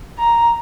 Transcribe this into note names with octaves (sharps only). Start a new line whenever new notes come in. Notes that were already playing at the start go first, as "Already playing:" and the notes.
A#5